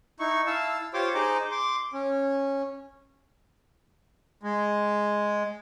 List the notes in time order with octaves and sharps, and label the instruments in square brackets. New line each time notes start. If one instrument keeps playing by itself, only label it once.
[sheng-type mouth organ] D#4 E4 C#6
E4 F5 A5 E6
F4 G4 C5 C#5 C6 D6
D#4 G#4 C5 D#5 A#5 D6
C6 D6
C#4
[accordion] G#3